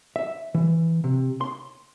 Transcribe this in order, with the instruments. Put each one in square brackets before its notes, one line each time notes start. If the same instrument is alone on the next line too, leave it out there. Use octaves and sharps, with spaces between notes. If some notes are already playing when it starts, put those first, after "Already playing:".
[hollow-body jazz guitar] E5
E3
C3
C6